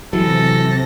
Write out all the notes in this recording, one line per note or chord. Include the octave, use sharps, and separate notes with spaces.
C3 E3 F#3 A4 A#6